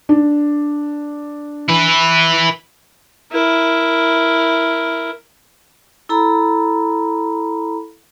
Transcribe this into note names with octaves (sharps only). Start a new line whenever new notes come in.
D4
E4 B4
E4 A#4
E4 A4 A#5 B5